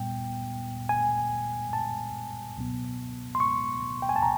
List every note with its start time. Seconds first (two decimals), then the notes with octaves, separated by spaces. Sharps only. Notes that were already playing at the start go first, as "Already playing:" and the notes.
Already playing: A#2 G3 B3 G5
0.89 G#5
1.73 A5
2.56 C#2 B2 F#3 B3
3.35 C6
3.40 C#6
4.02 G5
4.09 G#5
4.16 A5
4.22 A#5